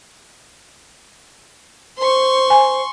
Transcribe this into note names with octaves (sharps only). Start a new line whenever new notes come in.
C5 C6 C#6
G#5